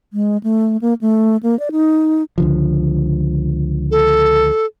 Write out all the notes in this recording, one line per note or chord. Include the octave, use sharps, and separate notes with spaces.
G#3
A3
A#3
A3
A#3
D5
D#4
C#2 D3 F3
A4